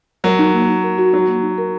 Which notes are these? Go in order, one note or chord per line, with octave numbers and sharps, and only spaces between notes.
F#3 A#4
D#4
A#3
D#4
A#4
F#4
F#3 D#4
A#3
D#4
A#4